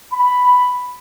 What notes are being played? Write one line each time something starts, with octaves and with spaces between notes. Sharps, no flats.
B5